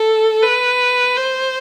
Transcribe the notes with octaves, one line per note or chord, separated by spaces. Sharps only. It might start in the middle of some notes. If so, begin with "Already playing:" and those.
Already playing: A4
B4
C5